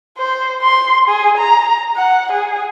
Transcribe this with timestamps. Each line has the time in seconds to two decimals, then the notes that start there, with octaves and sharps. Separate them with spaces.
0.18 C5
0.63 C6
1.09 G#4
1.38 A#5
1.96 F#5
2.32 G#4